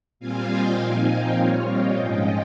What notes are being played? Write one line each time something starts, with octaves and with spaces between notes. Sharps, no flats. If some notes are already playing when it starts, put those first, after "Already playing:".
A#2 G3 C4 F4 F5 G#5
D#5 G5
A#2 F3 C4 D#4 F5 G#5
D#5 G5
A#2 G3 C4 F4 C#5 F5
D#5 G5
G#2 F3 G#3 C#4 F4 D#5 G5